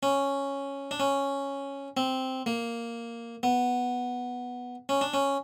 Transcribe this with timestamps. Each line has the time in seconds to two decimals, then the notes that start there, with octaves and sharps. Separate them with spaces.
0.03 C#4
0.91 D4
1.00 C#4
1.97 C4
2.46 A#3
3.43 B3
4.89 C#4
5.01 D4
5.14 C#4